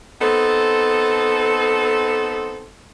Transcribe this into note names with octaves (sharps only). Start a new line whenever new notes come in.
B3 C4 D#4 A4